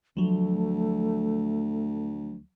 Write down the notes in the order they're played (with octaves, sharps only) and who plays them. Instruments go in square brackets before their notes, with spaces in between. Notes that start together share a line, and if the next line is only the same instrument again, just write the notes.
[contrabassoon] D2 [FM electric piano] F3 F#3 [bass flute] A3